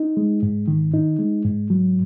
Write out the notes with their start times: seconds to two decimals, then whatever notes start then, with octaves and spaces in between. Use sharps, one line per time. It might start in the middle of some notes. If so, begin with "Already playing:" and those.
Already playing: D#4
0.17 G#3
0.43 G#2
0.68 D#3
0.94 D#4
1.19 G#3
1.45 G#2
1.70 F#3